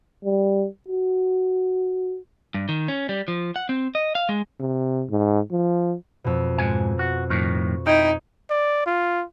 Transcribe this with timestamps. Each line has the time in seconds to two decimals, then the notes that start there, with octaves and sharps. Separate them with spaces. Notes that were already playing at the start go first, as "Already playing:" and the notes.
0.25 G3
0.88 F#4
2.54 G2
2.69 D#3
2.88 C#4
3.09 G3
3.28 F3
3.56 F#5
3.69 C4
3.95 D#5
4.15 F5
4.29 G#3
4.60 C3
5.10 G#2
5.52 F3
6.24 F2 B2
6.58 G#2 G#5
6.99 F#4
7.30 F2 A2 D#3 C#6
7.87 D#4 E4 G5 G#6
8.50 D5
8.86 F4